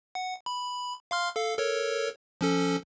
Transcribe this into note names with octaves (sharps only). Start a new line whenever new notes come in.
F#5
B5
F5 C6 F6
A4 F5
A4 A#4 C#5
F3 C#4 A4